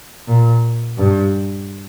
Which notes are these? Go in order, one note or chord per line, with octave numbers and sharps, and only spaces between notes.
A#2
G2